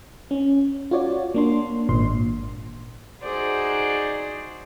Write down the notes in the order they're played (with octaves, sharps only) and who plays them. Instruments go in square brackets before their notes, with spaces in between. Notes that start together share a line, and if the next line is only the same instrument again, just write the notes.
[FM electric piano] C#4
F4 F#4 C#5 D5
A#3 D4 C6
G#1 A#2 C6
[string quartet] D#4 F#4 G#4 C5 D5